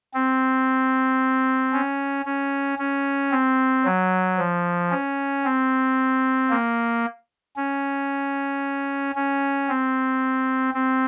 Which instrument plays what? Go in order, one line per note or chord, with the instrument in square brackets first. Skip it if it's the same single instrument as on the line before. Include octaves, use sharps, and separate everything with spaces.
[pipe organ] C4
C#4
C#4
C#4
C4
F#3
F3
C#4
C4
A#3
C#4
C#4
C4
C4